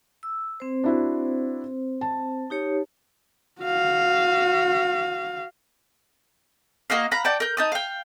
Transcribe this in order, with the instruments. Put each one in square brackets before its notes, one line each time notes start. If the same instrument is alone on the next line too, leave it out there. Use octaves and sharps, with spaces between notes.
[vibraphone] E6
C4 C5
[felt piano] D4 E4 F#4
A5
[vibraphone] D#4 G4 C#5
[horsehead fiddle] F#4 F5
[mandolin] A#3 F#4 D#5 F5
F5 F#5 A#5 B5
D5 F#5 G5 A5
A#4 G6
D#4 A5 D#6
F5 G5